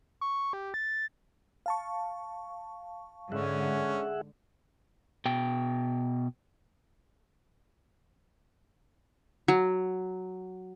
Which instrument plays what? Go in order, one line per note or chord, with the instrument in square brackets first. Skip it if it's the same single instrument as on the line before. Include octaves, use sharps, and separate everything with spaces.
[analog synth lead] C#6
G4
A6
[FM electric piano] F5 A5 C#6
[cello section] G#2 D3 [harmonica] C#4 [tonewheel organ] G#4 E5 F#5
[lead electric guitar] B2 G5
[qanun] F#3